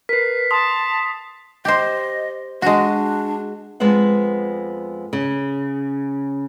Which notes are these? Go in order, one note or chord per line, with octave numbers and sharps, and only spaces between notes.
A#4 B4 B6 C7
A5 C6 D#6
G4 C5 D#5
G#3 D4 F#4
F2 G#3 B3 C5 F#5
C#3